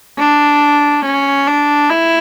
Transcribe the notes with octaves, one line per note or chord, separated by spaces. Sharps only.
D4
C#4
D4
E4